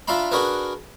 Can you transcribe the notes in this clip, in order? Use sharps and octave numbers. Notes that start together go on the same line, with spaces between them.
D4 F4 E5 F5 A#5 B5
D4 F#4 G#4 A#4 B4